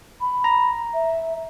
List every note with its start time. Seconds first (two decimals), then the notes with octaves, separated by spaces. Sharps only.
0.21 B5
0.44 A#5
0.94 E5